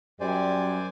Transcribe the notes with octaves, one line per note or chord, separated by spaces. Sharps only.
F#2 G3 C5 D5 G#5